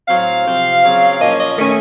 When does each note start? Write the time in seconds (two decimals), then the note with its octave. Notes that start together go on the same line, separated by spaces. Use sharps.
0.07 A2 F#3 C4 F5
0.45 C3 F3 C4
0.83 C#3 F#3 C4
1.20 A#2 F3 A#3 C#4 D#5
1.39 D#5
1.57 D#3 A3 C#4